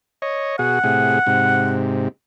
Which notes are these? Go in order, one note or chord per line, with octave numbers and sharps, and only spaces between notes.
C#5 D#5
B2 F#4 G#4 F#5
A2 C3 G#4
G#2 C3